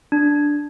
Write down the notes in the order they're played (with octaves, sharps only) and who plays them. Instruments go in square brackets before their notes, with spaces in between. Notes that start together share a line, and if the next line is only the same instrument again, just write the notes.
[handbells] D4